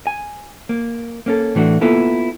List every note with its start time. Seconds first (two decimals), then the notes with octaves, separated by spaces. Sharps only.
0.07 G#5
0.69 A#3
1.26 A#3 C#4 A4
1.55 A2 E3 A3 D4 F#4
1.81 A#3 B3 E4 F4 A4 B4